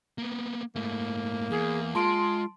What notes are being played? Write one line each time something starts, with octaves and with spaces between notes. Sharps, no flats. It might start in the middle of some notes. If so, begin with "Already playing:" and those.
A#3 B3
G#2 A3 A#3
E2 G#4
G#3 F4 A5 C6 D7